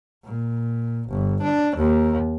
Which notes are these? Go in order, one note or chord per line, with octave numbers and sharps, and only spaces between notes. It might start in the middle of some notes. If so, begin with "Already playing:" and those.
A#2
G1
D4
D#2